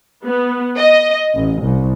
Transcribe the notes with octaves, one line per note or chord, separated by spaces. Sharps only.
B3
D#5
A1
C2